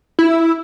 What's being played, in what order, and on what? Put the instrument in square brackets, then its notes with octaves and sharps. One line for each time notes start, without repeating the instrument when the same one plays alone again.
[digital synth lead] E4